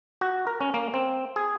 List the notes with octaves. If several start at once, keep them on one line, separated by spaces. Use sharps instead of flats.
F#4
A#4
C#4
A#3
C4
G#4